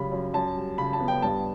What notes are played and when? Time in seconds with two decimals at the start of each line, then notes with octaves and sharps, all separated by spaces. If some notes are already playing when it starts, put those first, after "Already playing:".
Already playing: F#2 C#3 G3 B5
0.12 F#2
0.34 F#2 A5
0.56 G3
0.78 C#3 B5
0.93 A5
1.00 B3
1.08 G5
1.22 G2 A5